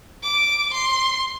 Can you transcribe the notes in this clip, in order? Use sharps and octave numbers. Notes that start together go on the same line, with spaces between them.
D6
C6